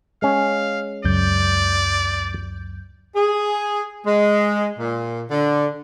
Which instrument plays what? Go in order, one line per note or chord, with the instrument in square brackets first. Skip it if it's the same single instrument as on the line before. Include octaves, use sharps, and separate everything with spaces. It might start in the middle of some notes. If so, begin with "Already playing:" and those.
[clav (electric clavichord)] G#3 C#4 [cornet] F5
[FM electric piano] C#2 F#2 G6 [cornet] D5
[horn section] G#4
G#3
A#2
D3